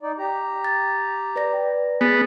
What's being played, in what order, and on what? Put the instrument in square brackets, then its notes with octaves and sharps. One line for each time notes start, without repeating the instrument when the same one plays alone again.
[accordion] D#4 D5
G4 A#5
[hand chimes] A6
B4 D5 A#6
[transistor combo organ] B3 [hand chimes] G#4 A6 [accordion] G#5